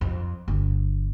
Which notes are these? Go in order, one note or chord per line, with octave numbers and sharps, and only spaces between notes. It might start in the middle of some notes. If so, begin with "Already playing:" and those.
F2
G1